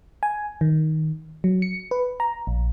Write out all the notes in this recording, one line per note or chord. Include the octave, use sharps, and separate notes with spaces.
G#5
D#3
F#3
C#7
B4
A#5
A#1